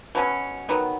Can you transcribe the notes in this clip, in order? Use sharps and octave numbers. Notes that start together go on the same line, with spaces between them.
B2 F#3 C#4
D#3 F#3 B3